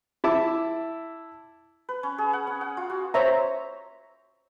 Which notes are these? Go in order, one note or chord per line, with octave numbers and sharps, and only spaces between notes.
E4 E5 A5 D6 E6
B4
C#4
G#4
F#5
C#4
F#5
F4
F#4
C5 C#5 E5 A#5